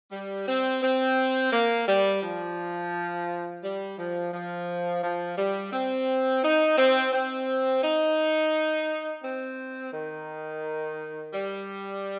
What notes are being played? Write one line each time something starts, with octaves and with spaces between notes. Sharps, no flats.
G3
C4
C4
A#3
G3
F3
G3
F3
F3
F3
G3
C4
D#4
C4
C4
D#4
C4
D#3
G3